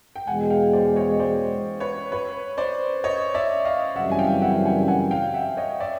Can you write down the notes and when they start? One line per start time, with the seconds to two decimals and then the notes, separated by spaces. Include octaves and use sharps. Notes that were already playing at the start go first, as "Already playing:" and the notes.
0.16 G5
0.27 E2 B2 G#3 F#5 G#5
0.50 F5 G5
0.73 C5 D5
0.96 C#5 D#5
1.20 C5 D5
1.80 B4 C#5
2.12 B4 C#5
2.57 C5 D5
3.04 C#5 D#5
3.34 D5 E5
3.65 D#5 F5
3.96 F#2 C#3 E3 G3 C4 E5 F#5
4.12 G#5
4.19 F5 G5
4.42 E5 F#5
4.65 F#5 G#5
4.88 F#5 G#5
5.11 F5 G5
5.34 E5 F#5
5.57 C#5 D#5
5.80 D5 E5